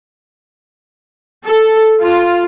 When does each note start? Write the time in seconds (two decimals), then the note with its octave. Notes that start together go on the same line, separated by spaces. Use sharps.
1.44 A4
2.01 F4